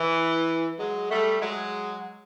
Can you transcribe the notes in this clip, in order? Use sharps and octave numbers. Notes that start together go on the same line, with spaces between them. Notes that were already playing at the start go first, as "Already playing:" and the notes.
Already playing: E3
F#3 G#3
G3 A3
F#3 G#3